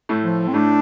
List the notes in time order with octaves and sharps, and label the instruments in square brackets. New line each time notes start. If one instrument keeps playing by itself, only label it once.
[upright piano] A2 A3
[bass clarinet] F3
C4
[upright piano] A2 A3 [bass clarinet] D4